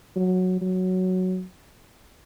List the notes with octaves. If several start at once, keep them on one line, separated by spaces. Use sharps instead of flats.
F#3
F#3